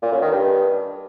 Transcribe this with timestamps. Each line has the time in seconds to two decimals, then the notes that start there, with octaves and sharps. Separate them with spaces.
0.02 A#2
0.12 F#2
0.22 D#3
0.32 G2